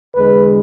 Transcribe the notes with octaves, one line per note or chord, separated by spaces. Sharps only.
E2 D3 G#3 B4